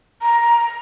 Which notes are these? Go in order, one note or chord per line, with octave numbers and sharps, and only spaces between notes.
A#5